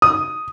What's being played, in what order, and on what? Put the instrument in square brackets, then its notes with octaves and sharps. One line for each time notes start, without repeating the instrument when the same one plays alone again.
[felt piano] D#6